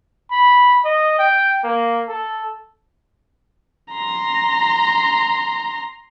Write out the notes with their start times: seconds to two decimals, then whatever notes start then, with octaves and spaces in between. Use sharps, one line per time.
0.31 B5
0.85 D#5
1.19 G5
1.64 A#3
2.08 A4
3.93 A#5 C6